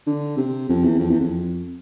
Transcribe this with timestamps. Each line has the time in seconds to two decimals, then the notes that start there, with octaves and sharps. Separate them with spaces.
0.07 D3
0.37 C3
0.69 F2
0.84 E2
0.99 F2
1.10 E2
1.20 F2